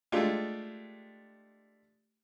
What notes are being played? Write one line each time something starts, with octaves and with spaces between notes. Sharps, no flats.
G#3 A3 D4 F4 G4